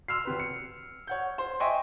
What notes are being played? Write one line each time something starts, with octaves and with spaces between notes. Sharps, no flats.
C6 E6 F6 C7
G#1 C3 B4
C#7
C#5 F#5 G6
C5
D#5 E5 G5 G#5 C6 C#6